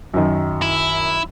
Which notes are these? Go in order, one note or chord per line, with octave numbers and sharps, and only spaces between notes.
F#2 D#3
E4